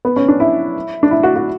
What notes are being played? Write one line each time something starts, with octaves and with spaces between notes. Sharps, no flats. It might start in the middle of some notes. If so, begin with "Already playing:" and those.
B3
C#4
D4
E4
D4
E4
F#4
F#4